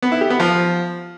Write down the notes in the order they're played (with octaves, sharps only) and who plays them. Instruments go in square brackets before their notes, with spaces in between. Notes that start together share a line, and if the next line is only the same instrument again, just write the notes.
[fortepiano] B3
E4
G4
B3
F3